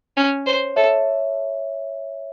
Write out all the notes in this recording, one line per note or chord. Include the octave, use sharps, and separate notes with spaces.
C#4
C5 C#5
A4 C#5 E5